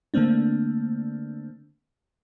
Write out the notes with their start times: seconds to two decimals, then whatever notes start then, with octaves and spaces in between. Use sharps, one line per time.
0.14 D3 A3 A#3 C4 D4